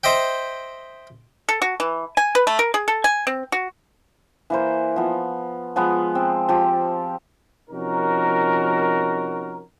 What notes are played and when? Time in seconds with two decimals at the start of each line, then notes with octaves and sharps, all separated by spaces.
0.04 C5 D#5 E5 G5
1.49 A4
1.62 F#4
1.80 E3
2.17 G#5
2.35 B4
2.47 A3
2.59 A#4
2.74 G#4
2.88 A4
3.04 G#5
3.27 C4
3.52 F#4
4.50 E3 A#3 C5
4.96 F3 B3
5.76 F3 G#3 B3
6.15 C4
6.49 F3 G4
7.70 C3 F3 C#4 D#4 F#4 A#4